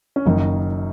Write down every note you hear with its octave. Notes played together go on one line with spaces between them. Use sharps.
C#4
F#1 F#2 D#3 D#4